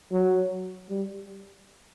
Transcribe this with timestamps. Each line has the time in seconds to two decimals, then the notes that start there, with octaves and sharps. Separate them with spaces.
0.12 F#3
0.90 G3